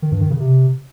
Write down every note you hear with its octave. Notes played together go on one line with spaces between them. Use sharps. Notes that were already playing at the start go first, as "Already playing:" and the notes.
D#3
G2
D#3
C#3
C3